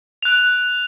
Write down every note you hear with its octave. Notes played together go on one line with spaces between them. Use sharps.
F#6 F7